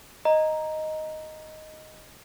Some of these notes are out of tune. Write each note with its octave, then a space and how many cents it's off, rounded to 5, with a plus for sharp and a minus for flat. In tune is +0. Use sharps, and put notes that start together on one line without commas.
D#5 +0 A#5 +0